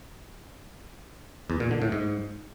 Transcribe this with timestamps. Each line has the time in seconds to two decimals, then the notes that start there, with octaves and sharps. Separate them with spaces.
1.50 E2
1.60 A#2
1.71 D3
1.82 A2
1.92 G#2